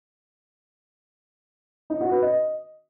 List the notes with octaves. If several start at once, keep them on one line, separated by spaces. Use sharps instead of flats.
D#4
F#4
B4
D#5